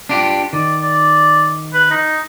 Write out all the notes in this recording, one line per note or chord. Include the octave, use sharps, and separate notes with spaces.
D4 F4 G4
D#3 D5
D5
B4
D#4